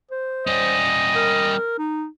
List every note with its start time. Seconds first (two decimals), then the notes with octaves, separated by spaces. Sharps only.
0.11 C5
0.47 G3 C#4 D#5
1.16 A#4
1.78 D#4